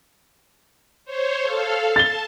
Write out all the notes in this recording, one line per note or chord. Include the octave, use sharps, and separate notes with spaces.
C5 C#5
A4 F5
A5 A6 G7